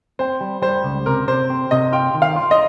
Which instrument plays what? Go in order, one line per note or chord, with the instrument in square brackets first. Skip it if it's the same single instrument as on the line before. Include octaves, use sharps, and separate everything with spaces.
[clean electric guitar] C4 [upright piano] C5
[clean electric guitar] G3
[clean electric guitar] G3 [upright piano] C5
[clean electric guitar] C#2
[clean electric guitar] C3 [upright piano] A#4
[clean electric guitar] C3 [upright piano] C5
[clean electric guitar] C4
[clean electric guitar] C3 [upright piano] D#5
[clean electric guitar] F4 [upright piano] G5
[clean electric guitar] D#3
[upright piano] F5
[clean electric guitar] F4
[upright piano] D#5